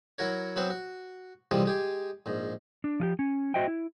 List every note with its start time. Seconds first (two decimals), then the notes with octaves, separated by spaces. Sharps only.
0.18 F#3 E4 F#4 A#4 C#5
0.56 F#3 B3 C4 F#4 C5 E5
0.70 F#4
1.51 C2 C3 E3 F3 G3 G#3
1.65 G#3 G4 G#4
2.26 A#1 G#2
2.84 D4
3.00 F3 F4 G4
3.19 C#4
3.54 F#4 C5 D#5 E5 G5
3.68 E4